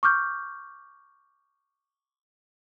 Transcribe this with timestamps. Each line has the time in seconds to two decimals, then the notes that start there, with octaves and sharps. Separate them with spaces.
0.03 C#6 D6 F6 G6